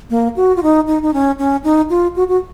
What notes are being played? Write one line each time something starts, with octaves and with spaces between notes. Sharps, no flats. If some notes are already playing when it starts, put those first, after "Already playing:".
A#3
F#4
F4
D#4
D#4
D#4
C#4
C#4
D#4
F4
F#4
F#4